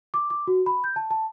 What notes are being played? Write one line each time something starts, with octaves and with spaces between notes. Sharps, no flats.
D6
D6
F#4
B5
G6
A5
A5